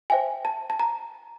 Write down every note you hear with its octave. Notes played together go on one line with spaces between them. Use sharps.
C5 E5 G5 G#5
A5
A5
A#5